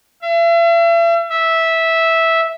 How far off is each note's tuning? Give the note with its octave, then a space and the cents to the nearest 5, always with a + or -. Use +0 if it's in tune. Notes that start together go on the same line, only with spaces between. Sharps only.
E5 +40
E5 -10